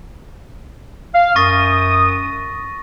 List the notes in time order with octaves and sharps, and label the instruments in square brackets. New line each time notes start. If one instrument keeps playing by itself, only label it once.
[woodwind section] F5
[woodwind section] F#2 D#6 [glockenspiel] C#6 A6 A#6